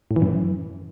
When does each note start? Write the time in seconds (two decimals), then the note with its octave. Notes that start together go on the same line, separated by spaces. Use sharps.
0.11 A2
0.16 E3
0.22 F#2